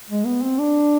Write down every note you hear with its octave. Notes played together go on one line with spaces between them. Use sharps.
G#3
B3
C4
D4